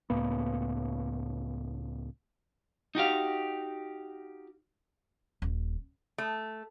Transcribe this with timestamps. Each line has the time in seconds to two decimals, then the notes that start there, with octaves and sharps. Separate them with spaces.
0.10 C#2 A2 A#3 B3
2.95 D#4 F#4 G4 F5
5.42 D#1
6.18 A3